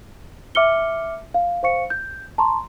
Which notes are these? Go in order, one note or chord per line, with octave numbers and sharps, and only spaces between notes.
E5 D6 F6 C#7 G7
F5
C5 F5 C#6 C#7
G6
A5 A#5 C6 C#6